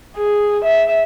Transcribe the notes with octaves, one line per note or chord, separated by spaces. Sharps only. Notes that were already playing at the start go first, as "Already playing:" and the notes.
G#4
E5